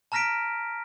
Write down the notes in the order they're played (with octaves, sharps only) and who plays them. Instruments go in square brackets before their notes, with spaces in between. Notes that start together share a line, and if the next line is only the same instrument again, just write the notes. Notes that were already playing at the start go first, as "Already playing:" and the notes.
[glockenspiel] A5 A#5 F6 A#6 B6 D7